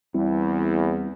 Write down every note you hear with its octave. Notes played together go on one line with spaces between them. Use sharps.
E2 G3 C4 E4